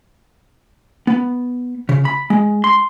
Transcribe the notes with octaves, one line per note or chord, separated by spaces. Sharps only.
B3
C#3
B5
G#3
C6